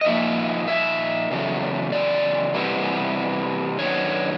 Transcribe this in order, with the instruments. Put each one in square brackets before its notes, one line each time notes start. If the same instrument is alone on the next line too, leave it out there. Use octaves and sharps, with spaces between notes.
[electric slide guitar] D#5
A#2 F3 A#3 D#4 E5
E5
E2 C#3 F#3 A3
D5
C3 E3 G3 B3 E4
F#2 D#3 B3 D4 C#5